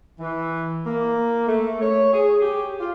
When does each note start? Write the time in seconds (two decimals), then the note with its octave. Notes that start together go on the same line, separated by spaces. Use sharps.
0.20 E3
0.86 A#3
1.47 A3
1.81 C#5
2.13 G#4
2.42 G4
2.80 F4